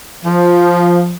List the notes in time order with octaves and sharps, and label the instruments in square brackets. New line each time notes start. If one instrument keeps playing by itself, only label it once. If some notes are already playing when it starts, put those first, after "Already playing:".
[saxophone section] F3